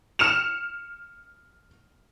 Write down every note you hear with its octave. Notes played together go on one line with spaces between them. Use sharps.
F6 C#7 E7 F7